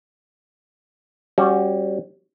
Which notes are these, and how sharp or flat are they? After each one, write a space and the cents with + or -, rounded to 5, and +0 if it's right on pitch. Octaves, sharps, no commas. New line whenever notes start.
G3 +0 C#4 -30 F#4 +0